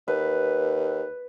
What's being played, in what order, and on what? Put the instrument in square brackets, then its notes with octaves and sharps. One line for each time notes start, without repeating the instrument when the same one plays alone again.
[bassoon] D#2 [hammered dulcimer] B4